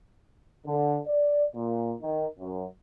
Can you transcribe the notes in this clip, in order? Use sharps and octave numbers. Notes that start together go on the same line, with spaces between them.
D3
D5
A#2
D#3
F#2